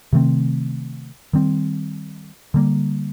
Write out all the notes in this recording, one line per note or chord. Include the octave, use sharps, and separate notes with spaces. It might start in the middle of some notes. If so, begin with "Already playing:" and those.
C3 D#3 A3 C4
D#3 G3 C4
D3 G3 A#3